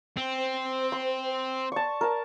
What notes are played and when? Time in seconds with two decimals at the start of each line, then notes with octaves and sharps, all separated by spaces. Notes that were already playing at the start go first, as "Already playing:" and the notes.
0.17 C4
0.38 C5
0.92 C6
1.72 D5 A5 C#6
2.01 A#4 A5